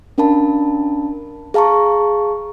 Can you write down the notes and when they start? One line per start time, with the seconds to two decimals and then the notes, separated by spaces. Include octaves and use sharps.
0.18 C#4 D4 A#4 F5 A5 B5
1.54 G#4 F5 A5 A#5 C#6